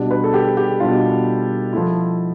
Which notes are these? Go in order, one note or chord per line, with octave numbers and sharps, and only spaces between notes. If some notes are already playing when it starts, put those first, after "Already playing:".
Already playing: B2 G3 D4
B4
A4
G4
G4
B2 G3 D4 F4
F3 A3 E4